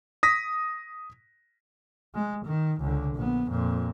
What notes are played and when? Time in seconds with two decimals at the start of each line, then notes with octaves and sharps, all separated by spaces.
0.23 D#6 A#6 B6
2.15 G#3
2.45 D#3
2.80 C#2 D3
3.16 A#1 B3
3.48 F2 A#2